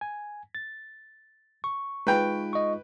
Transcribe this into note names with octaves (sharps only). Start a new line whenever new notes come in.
G#5
A6
C#6
G#3 D#4 F4 B4 G5
D#5 C#6